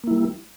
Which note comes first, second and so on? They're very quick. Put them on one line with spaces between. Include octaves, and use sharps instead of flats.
A#3 E4 G3